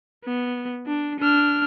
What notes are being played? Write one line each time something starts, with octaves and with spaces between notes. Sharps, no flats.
B3
D4
D4 F6